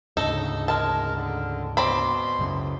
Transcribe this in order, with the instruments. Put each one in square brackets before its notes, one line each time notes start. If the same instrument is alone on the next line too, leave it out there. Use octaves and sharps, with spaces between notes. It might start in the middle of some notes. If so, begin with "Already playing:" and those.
[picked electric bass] D2 G#2 C#3 [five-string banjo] D#4 A4
[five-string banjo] G#3 A5 [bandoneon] A#4
[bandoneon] D3
[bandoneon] B2 C6 [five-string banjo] C4 D5 B5
[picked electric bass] C#2 F#2 C#3